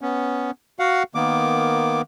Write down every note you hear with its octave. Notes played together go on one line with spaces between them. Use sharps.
B3 C#4
F#4 F5 F#5
D#3 A#3 B3 D6